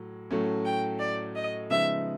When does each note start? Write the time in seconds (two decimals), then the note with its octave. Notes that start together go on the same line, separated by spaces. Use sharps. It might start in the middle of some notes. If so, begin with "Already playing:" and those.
Already playing: A2 F#3
0.31 A2 F#3 A3 C#4
0.65 G5
0.99 D5
1.35 D#5
1.70 C#3 F3 G#3 B3 D#4 E5